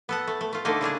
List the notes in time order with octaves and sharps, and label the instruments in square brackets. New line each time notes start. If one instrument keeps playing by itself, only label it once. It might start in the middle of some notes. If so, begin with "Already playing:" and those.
[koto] B3 A4 F#5
A3
A3
A3 F4
D3 A3 A#3 D#4
C#3 G3 D4 G#4